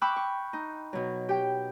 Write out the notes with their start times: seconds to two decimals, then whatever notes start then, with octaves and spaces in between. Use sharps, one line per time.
0.01 G5 B5 C#6 D6 E6 F#6
0.16 C#6
0.53 D#4
0.93 B2 F#3
1.29 G4 G5